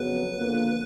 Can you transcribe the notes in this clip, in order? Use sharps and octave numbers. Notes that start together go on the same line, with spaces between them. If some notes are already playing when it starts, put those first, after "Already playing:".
Already playing: F2 C#3 F#3 B3 B4
F2 D3 F3 A#3